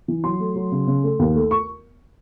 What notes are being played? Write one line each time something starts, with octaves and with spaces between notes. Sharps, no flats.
E3
F#3 C6
A3
F#3
C#3
C#3
A3
D#2
A3
C#6